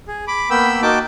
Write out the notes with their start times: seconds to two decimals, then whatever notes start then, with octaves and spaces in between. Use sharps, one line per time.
0.08 G#4
0.28 B5 D6
0.50 A#3 B3 G5 B5 E6
0.82 A#3 D#4 F#4 G5 A5 D6